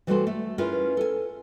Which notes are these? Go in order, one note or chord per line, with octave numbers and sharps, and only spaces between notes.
E3 G3 A3 F#4 A4 C5
A3
C#4 E4 F4 G#4 A#4 B4
A4 G#5